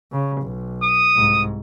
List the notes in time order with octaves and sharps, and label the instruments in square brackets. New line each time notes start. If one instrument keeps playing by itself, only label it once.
[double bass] C#3
B1
[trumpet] D#6
[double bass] C2 G#2